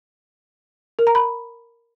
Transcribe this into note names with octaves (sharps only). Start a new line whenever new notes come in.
A#4
A#5
B5